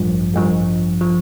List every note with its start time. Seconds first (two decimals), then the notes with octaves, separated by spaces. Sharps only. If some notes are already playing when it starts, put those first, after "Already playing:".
Already playing: A1 G2 F3
0.34 A1 G2 F3
1.01 F3